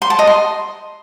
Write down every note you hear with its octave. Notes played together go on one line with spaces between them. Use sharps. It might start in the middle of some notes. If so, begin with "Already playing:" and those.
C6
A5
D#5
C6